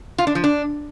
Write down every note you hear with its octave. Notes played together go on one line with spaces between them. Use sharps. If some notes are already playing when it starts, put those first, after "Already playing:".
F4
D4
F3
D4